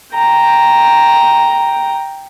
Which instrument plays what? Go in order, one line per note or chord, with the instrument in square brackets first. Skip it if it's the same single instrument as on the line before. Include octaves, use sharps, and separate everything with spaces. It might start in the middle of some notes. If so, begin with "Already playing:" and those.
[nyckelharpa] G5 A#5